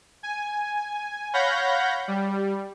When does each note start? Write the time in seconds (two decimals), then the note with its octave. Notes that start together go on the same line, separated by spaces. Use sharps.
0.23 G#5
1.33 C#5 F5 F#5 B5 G6 A#6
2.08 G3